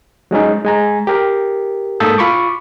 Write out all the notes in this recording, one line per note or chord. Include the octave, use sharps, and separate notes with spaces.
F#3 G#3 C#4 D#4
G#3 G#5 A#5
G4 A#4
G#2 A#3 A4 D#6 E6 G6
F4 B5 C#6 D6